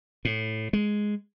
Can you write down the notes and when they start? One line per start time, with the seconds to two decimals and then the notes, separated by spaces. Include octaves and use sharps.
0.25 A2
0.73 G#3